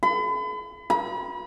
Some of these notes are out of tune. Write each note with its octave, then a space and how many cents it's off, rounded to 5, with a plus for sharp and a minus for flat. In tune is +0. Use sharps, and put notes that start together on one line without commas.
B5 +40
B5 -40